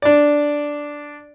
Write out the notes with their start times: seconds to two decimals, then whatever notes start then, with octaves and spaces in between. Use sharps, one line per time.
0.02 D4 D5